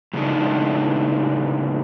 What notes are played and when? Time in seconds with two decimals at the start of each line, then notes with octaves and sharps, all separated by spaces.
0.13 A2 C#3 G#3 A3 D4 D#4